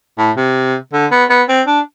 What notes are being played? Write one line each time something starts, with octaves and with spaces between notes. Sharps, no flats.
A2
C3
D3
B3
B3
C4
D4